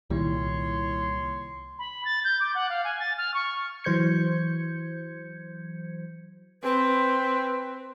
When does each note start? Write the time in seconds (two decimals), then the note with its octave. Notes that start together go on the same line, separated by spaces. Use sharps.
0.10 C2 A#2 D#3 G3 E4 C#5 C6
1.79 B5
2.05 A6
2.24 G6
2.40 D6
2.55 F#5
2.70 F5
2.84 G#5
3.00 A6
3.18 F6
3.34 C#6
3.84 E3 F#3 C5 G6 G#6 C#7
6.63 C4 B4